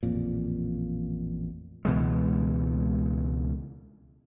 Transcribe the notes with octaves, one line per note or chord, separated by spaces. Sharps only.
A1 F2 A#2
C#2 B2 E3 G#3